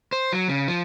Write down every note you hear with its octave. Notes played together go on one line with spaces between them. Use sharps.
C5
F#3
C#3
F3